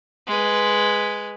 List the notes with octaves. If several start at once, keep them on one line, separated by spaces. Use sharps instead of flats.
G#3 B4